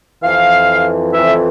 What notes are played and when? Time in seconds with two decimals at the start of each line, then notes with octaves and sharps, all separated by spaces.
0.22 F2 E3 F5
1.13 F2 E3 E5